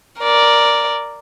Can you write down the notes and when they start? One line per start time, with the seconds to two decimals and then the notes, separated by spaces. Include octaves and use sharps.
0.21 A#4 D5